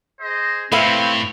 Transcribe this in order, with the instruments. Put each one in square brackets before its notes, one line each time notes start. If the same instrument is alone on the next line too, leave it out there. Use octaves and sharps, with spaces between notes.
[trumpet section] G#4 C5 D#5
[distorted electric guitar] A2 [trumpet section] C4 [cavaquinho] B4 E5 F5